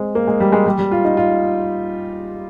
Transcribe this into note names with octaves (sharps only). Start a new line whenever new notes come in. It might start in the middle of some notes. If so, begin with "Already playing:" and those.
Already playing: G#3 C4
A#3
G#3
G3
G#3
G3
G3
F4
D#4
F4